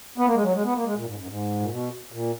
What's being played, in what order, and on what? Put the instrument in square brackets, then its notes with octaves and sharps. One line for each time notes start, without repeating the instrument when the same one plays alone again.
[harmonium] B3
A#3
G#3
F#3
G#3
B3
A#3
G#3
A#2
G#2
F#2
G#2
A#2
B2
A#2